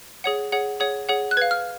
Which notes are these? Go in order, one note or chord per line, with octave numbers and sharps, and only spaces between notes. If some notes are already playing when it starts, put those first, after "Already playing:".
G#4 C#5 F#5
G#4 C#5 F#5
G#4 C#5 F#5
G#4 C#5 F#5
F#6
B4 F5 G#6
F6